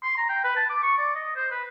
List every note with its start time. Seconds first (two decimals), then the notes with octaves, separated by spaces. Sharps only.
0.03 C6
0.17 A#5
0.29 G5
0.44 B4
0.56 A5
0.70 D6
0.83 C#6
0.98 D5
1.15 D#5
1.36 C5
1.51 B4